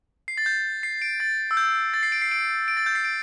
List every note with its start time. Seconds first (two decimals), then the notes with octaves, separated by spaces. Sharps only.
0.28 C7
0.38 A6
0.46 G6
0.83 C7
1.02 D7
1.20 A6
1.51 E6
1.57 G6
1.94 A6
2.03 C7
2.12 D7
2.22 C7
2.32 D7
2.68 D7
2.77 A6
2.86 G6
2.95 C7
3.05 D7